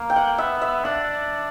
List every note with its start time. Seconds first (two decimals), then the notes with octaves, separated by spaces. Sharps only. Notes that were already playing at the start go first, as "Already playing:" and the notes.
Already playing: A#3
0.10 G5
0.16 F#5
0.38 B3 E5
0.62 E5
0.84 D4 F#5